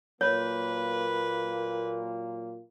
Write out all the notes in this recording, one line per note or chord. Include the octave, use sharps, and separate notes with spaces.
A#2 F#3 A#3 B4 C#5